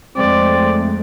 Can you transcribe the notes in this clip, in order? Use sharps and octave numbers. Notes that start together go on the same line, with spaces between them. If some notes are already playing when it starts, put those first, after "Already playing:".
F2 G#3 A3 C4 D5